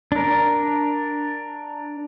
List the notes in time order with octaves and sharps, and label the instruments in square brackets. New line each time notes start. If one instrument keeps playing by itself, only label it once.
[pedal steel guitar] D4 A#4